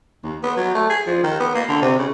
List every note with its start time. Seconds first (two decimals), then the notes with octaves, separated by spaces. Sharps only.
0.23 D#2
0.43 B3
0.57 F#3
0.75 A3
0.90 G#4
1.07 F3
1.23 D#3
1.40 B3
1.55 A#3
1.68 D3
1.82 C3
1.99 C#3